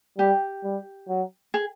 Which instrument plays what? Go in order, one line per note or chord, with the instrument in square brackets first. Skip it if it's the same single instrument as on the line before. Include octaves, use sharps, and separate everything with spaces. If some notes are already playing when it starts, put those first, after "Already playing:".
[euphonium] G3 [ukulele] G4
[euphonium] G3
F#3
[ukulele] G#4